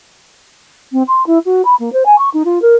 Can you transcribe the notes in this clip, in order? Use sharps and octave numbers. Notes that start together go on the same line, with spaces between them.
C4
C6
E4
F#4
B5
A#3
C5
G#5
C#6
D#4
F4
A#4